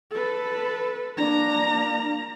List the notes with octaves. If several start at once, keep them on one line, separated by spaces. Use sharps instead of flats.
A4 B4
A#3 D4 A#5